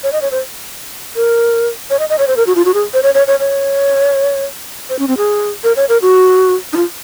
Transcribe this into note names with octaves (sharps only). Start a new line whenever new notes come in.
C#5
D#5
C#5
C5
A#4
C#5
D#5
D#5
C#5
C5
A#4
F#4
F4
F#4
G#4
C5
C#5
C#5
C#5
C#5
C5
C#4
C4
G#4
A#4
C#5
A#4
F#4
D#4
F4